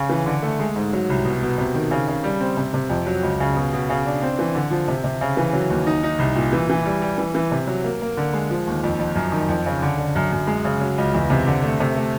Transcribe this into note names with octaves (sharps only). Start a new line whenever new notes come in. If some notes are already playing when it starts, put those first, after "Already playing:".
Already playing: C#3
E3
D3
A3
G#3
G#2
F#3
C2
B2
B2
C3
D#3
C#3
C#3
G3
C4
C3
C3
F2
F#3
C#2
C#3
B2
B2
C#3
D4
C4
E3
D3
F3
C3
C3
C#3
E3
F#3
D#2
D#4
D#4
C2
A#2
E3
E3
G3
G3
E3
E3
C3
F#3
A#3
A#3
D3
G#3
F3
D#2
F2
F2
F#2
D#3
F2
C#3
D3
D3
F#2
F#2
G#3
C#3
F#3
C#2
E2
C3
D3
A3
C3
A3